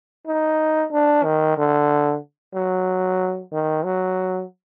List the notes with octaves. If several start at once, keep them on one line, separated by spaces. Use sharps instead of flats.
D#4
D4
D#3
D3
F#3
D#3
F#3